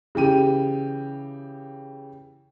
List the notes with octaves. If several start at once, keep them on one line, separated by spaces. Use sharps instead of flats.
C#3 E3 G4 D#7